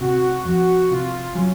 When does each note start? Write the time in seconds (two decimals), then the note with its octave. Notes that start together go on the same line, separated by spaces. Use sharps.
0.01 C3 F#4
0.45 F2 F#4
0.90 C3 F4
1.35 F#3 C#4